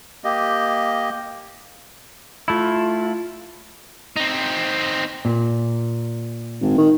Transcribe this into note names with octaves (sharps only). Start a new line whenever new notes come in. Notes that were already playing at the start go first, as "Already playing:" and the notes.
A#3 G4 D#5
A3 E4 F4
C4 D#4
A#2
G#1
D#3